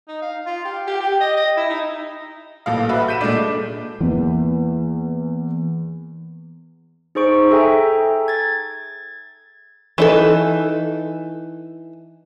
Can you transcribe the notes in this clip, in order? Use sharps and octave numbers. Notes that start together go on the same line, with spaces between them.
D#4
F5
F4
G4
G4
G4
D#5
D#5
E4
D#4
A1 A#2 A4 F5
F#4 B4 E5
G6 B6 D#7 E7
A#2 G#3 A3 D4
E2 E3 A#3
D#4 G#4 C5 C#6 D7
G#4 A4 E5 G5 G#5 A#5
G#6 A6
E3 D#4 A4